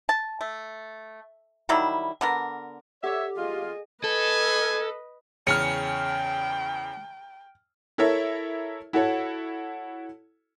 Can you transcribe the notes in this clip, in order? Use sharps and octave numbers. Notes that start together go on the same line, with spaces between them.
A5
A3
D#3 F#3 G3 E4
D3 B3 A#4
G4 A4 C#5 D5 E5 F#5
F4 G#4 D#5
A4 B4 D#5 G#5
E2 C#3 C#4 G5 F6 C#7
E4 A4 A#4 C#5 E5
E4 F#4 A4 C#5